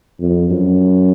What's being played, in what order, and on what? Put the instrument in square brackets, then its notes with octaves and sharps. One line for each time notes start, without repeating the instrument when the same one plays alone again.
[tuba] F2
F#2